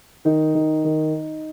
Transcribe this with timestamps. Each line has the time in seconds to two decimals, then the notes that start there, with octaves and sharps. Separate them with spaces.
0.25 D#3 D#4
0.55 D#3
0.84 D#3